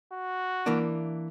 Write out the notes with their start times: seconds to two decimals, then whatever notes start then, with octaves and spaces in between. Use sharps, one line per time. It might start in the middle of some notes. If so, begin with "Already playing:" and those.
0.13 F#4
0.66 E3 A#3 D4